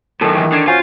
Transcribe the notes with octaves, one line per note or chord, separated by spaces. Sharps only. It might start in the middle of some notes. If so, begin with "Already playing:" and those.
F#2 A2 D#3 A4
E3
D3 D6 G#6 C7
C#4 F4 F#4 C5 G#5